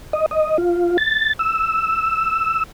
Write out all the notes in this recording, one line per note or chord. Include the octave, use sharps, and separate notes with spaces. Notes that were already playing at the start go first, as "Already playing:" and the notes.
D#5
D#5
F4
A6
E6